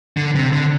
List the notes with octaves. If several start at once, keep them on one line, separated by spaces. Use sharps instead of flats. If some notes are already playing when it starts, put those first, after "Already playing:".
D3
C3
D3